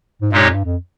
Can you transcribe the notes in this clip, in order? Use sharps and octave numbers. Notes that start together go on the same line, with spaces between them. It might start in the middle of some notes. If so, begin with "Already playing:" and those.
G#2
G2 A#2 G#3 D#4 G4 C#5
F2
G2
F2